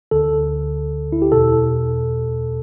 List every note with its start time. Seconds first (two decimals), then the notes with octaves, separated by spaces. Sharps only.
0.11 D2 D3 A4
1.13 E4
1.22 G4
1.32 E2 B2 A4